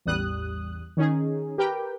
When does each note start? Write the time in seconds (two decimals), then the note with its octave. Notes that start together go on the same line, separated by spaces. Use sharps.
0.05 A1 E2 G3 D#6 F#6
0.97 D#3 C#4 D#4 G#4
1.58 G4 A#4 B4 G5